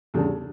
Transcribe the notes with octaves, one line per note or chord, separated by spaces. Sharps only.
E2 C#3 G3 D4 A4